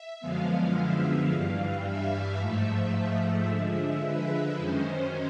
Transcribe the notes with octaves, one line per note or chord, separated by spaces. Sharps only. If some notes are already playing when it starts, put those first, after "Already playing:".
Already playing: E5
F#2 D3 F3 G#3 B3 F5
E5
G2 E3 G3 F5
E5
G#2 F3 A3
D3 F3 G#3
B4
F#2 D#3 G#3 C#4 C5